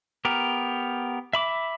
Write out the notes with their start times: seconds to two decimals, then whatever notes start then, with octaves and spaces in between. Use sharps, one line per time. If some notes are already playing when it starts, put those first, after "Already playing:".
0.25 B3 G4 A#4
1.33 E5 B5 D6